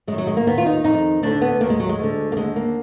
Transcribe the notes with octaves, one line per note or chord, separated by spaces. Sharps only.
F#2 D#3 G#3
F#3
G#3
A#3
D#2 D#3 B3
F4
D#4
F2 D#3 D#4
D2 D3 D4
B3
D#2 D#3 A#3
G#3
F#3
G#3
D2 D3
A#3
D#2 D3 G#3
A#3